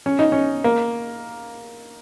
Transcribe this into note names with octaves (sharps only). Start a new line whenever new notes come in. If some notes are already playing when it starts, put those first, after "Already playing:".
C#4
D#4
C#4
A#3